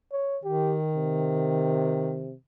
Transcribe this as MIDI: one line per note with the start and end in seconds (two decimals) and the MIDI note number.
0.12 0.39 73
0.44 2.34 51
0.44 0.77 67
0.95 2.35 48